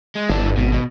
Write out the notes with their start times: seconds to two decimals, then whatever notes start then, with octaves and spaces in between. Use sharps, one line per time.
0.15 G#3
0.29 G1 E3 D4
0.57 G#1 B2
0.73 B2